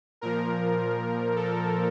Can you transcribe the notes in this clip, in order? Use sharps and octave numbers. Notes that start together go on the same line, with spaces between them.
A#2 F3 A#4
A4